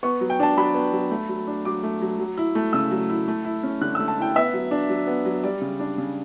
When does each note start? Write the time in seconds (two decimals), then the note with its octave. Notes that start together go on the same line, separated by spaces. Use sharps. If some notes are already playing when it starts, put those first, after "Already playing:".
0.03 B3 C#6
0.21 F#3
0.30 G5
0.40 D4 A5
0.57 F#3 B5
0.74 B3
0.93 F#3
1.11 A3
1.29 F#3
1.47 D4
1.65 F#3 D6
1.83 A3
2.02 F#3
2.19 F#3
2.37 E4
2.55 A3
2.73 C#3 E6
2.91 F#3
3.09 E4
3.28 A3
3.45 E4
3.63 C#4
3.81 D3 F#6
3.95 E6
4.00 A3
4.08 A5
4.18 E4 G5
4.36 B3 E5
4.54 F#3
4.71 D4
4.89 F#3
5.07 B3
5.26 F#3
5.43 G3 D5
5.61 C#3
5.80 D4
5.98 C#3